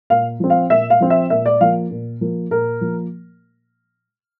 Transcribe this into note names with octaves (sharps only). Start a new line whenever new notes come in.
A#2 F5
F3 C4
F5
A#2 E5
F5
F3 C4
E5
A#2 E5
D5
F3 A#3 F5
A#2
F3 A#3
A#2 A#4
F3 A#3